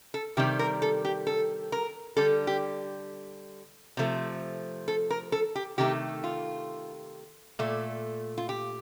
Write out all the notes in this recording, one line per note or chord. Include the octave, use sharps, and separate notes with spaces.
A4
C3 D#3 G3 G4
A#4
A4
G4
A4
A#4
D3 G3 A4
G4
C3 F3 A3
A4
A#4
A4
G4
C3 D#3 A3 G4
F4
A#2 A3
F4
G4